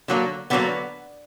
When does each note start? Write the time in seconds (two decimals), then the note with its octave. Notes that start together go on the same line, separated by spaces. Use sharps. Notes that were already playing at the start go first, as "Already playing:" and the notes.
0.08 D3 F#3 A#3
0.50 D3 F#3 A#3 B3